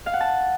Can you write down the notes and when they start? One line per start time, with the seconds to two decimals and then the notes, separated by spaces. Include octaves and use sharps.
0.06 F5
0.13 F#5
0.21 A5